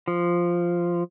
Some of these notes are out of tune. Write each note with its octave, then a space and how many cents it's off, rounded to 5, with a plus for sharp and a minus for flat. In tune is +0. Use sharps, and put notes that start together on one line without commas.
F3 -5